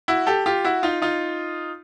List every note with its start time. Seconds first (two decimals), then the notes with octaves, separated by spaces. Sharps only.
0.08 E4 F#4
0.27 G4 A4
0.46 F4 G4
0.64 E4 F#4
0.83 D#4 F4
1.02 D#4 F4